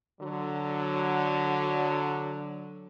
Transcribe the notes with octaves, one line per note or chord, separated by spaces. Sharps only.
D3 F#3